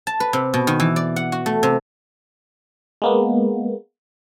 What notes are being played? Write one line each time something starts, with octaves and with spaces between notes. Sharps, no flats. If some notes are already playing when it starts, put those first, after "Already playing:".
A5
B4
C3
B2
D#3
E3
D5
F#5
F#4
A3
C3
G#3 A#3 B3